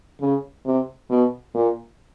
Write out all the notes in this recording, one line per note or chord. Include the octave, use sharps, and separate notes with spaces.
C#3
C3
B2
A#2